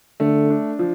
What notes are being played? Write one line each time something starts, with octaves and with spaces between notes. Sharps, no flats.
D3 A3
D4
F3